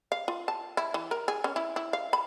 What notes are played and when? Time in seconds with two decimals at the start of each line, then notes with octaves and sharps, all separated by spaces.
0.12 F5
0.28 F4
0.48 A5
0.77 E4
0.94 E3
1.11 A#4
1.28 G#4
1.44 C#4
1.56 E4
1.76 E4
1.93 F5
2.13 B5